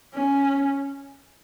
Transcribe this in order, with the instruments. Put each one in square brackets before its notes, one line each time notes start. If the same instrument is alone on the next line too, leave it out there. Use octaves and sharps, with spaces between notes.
[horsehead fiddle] C#4